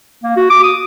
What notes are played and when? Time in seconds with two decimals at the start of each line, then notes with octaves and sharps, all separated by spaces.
0.23 A#3
0.37 F#4
0.50 D6
0.63 D#6